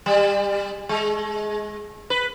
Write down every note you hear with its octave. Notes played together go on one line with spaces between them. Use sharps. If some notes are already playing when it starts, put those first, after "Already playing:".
G3
G#3
B4